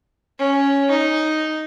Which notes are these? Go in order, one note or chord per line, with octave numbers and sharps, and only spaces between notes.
C#4
D#4